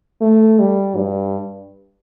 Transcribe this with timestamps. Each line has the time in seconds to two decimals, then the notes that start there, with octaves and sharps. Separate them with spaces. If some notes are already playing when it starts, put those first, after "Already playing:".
0.22 A3
0.60 G3
0.97 G2